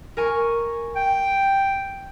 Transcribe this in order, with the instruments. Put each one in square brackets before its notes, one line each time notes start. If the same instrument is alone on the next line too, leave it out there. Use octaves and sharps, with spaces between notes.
[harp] A#4 G#5 C#6
[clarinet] G5